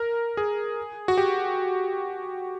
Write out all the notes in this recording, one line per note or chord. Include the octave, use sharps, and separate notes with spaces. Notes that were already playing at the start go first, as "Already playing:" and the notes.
Already playing: A#4
G#4
F#4
G4